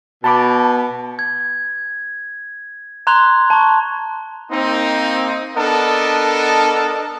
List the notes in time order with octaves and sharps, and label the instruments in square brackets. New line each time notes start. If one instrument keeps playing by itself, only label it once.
[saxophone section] B2 [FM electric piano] A5 B5 D6
[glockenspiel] G#6
A#5 C6 F#6 G#6 F7 G7
A5 C#6
[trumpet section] A#3 C4 D#4
B3 D4 A4 A#4 D#5 A5